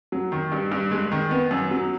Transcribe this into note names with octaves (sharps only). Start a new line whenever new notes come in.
F#3
D#3
G2
G2
G#3
D#3
B3
F#2
F#3